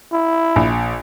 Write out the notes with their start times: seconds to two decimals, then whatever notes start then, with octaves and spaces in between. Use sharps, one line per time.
0.12 E4
0.56 A#1